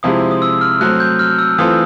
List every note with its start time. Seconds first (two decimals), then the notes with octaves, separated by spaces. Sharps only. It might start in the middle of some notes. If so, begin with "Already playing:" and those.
0.03 C3 F3 G#3 C4 E4 D#6
0.31 D#6
0.42 E6
0.61 F6
0.81 F#3 A3 C4 F#6
1.00 G6
1.19 F6
1.39 E6
1.58 E3 A3 C4 F4 A4 D#6